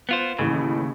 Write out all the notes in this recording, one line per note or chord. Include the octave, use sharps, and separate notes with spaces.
B3 F4 C5
A1 D#2 A2 C#3